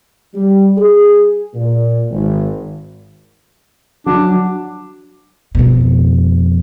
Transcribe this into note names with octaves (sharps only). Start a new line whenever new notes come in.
G3
G#4
A#2
G#1
F#3 D4
F2 B2